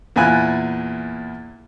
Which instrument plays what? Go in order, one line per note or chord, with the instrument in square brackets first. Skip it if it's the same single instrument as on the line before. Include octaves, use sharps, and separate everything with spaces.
[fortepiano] E2 A#2 E4 G#5 F#6